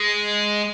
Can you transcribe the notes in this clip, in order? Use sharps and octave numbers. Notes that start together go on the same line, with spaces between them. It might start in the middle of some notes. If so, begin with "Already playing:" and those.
Already playing: G#3